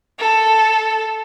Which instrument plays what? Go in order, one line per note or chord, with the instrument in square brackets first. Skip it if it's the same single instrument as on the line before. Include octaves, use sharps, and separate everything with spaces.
[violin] A4